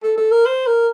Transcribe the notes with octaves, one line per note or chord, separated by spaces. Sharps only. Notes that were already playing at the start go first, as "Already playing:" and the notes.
A4
A4
A#4
C5
A#4